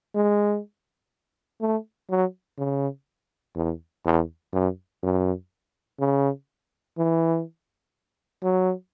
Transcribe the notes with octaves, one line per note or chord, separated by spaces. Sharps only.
G#3
A3
F#3
C#3
E2
E2
F#2
F#2
C#3
E3
F#3